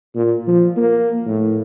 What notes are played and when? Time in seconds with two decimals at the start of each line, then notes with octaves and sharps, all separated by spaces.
0.15 A#2
0.47 F3
0.77 A#3
1.26 A2